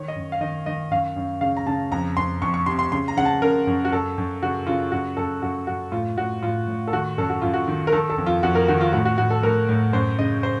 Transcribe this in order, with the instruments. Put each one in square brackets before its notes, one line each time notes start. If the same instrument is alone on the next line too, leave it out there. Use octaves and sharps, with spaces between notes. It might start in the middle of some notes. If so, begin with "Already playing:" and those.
Already playing: [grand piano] D#3 C#5
D#5
F#2
F5
D#3 D#5
D#3 D#5
F#2 F5
F#2
C#3 F5
A#5
C#3 A5
F2 A#5
F2 C6
F2 C#6
C#6
C3 C6
C6
C#3 C6
A#5
C#3 F#5
A5
C#3 A#4
F#2
F#4
F#2 A4
F#2
C#3 F#4
C#3 F4
F#2 F#4
F#2 A4
F#2 F#4
F#2 F#4
A2 F4
A2 F#4
A2 F4
A2
A4
D#3 F#4
F#2 A4
F#4
F#2 F4
F#4
D#3
A#4
D#3 A4
A4
F2
F4
F2 F#4
A#4
D#3 F#4
F4
A2 F#4
F#4
A2 F#4
A4
A2 A#4
A2
F#2 C5
C#3 D#5
C5